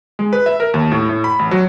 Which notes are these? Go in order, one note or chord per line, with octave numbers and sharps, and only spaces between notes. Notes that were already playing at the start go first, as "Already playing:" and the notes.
G#3
B4
E5
A#4
D#2
A2
A2
B5
A1
F#3